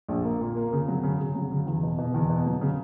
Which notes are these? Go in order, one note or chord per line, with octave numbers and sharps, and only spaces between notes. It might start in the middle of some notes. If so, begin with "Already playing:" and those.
A#1
A#3
A#2
A#3
C#3
F#3
C#3
C#3
F#3
C#3
E2
B2
B2
E2
B2
F#3
C#3